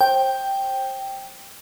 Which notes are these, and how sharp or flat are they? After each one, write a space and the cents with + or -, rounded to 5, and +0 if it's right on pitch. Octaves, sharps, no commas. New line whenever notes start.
C5 +30 G5 +0